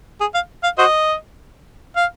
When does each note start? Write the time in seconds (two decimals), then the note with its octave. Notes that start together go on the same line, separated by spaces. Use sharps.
0.21 G#4
0.35 F5
0.64 F5
0.78 F#4 C5 D#5
1.96 F5